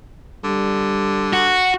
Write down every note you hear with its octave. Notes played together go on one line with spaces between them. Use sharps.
D3 G3
F#4